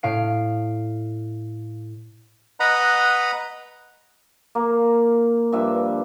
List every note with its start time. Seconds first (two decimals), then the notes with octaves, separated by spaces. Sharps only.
0.03 A2 F5 D7
2.60 B4 D#5 F#5 A#5 B5
4.55 A#3
5.52 G2 F3 E5